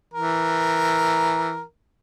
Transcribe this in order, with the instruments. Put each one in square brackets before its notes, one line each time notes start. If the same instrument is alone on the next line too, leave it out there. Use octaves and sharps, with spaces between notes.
[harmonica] E3 A#4